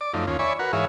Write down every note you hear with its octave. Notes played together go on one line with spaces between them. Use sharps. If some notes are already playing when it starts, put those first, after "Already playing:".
D5 D6
F#2 F3 A3 D#4
D#2 C#4 F4
C#5 D5 E5 G#5 B5 C#6
F#4 A#4 B4 F#5
G#2 E3 G#4 C#5 E5 F5